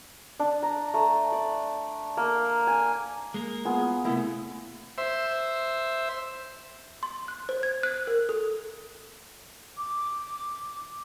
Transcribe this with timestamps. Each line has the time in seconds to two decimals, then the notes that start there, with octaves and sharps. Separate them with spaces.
0.40 D4
0.63 A#5
0.94 A3
1.32 D5
2.17 A#3
2.67 G#5
3.34 G#3 A#3 A#4
3.65 B3 F4 G#4
4.05 C3 A3 A#3 E4
4.98 C5 E5
7.03 C6
7.28 F#6
7.49 C5
7.63 G#6
7.83 F#6
8.07 A#4
8.29 A4
9.78 D6